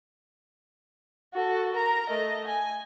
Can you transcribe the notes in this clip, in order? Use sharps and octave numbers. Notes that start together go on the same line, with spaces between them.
F#4 A4
A#4 A#5
A3 D#5
G#5